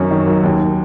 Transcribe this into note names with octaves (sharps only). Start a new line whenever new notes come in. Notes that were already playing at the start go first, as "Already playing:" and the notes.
Already playing: F#2 D#3 C#4
D#3
F#3
D#2